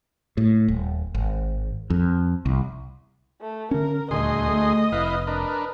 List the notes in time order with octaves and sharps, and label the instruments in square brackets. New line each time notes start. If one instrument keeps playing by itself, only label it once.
[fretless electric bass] A2
D#1
G#1
F2
C2
[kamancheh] A3
[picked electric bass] D3 C#4 [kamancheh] A#4
[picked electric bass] D#1 [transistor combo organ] D2 G#4 C6 [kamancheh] D#5
[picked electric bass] A3
[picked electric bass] F1 [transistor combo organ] E4 B4 F5
[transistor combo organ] D4 A#4 B4